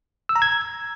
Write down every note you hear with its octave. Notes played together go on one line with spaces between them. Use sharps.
E6
A#5
G#6